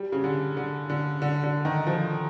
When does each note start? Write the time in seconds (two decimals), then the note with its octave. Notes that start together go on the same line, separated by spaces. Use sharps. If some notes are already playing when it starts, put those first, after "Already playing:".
Already playing: G3
0.12 C#3
0.24 D3
0.57 D3
0.90 D3
1.22 D3
1.43 D3
1.65 D#3
1.87 F3